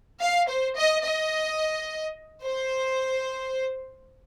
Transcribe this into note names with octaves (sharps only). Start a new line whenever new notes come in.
F5
C5
D#5
D#5
C5